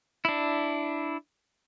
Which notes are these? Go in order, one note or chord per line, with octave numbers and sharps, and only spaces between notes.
D4 E4